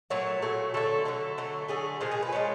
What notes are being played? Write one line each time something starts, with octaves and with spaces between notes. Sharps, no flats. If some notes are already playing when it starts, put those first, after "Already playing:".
A#2 F#3 A3 C#5
A#2 F#3 A3
D3 F#3 A3 A4
D3 F#3 A3 A4
D3 F#3 A3
D3 F#3 A3 G#4
A#2 F3 G#3 G#4
G#4
B4
A#2 F3 G#3 C#5